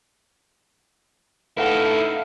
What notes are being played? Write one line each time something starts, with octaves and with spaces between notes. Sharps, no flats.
A3 D#4 E4 B4 F5 F#5 A5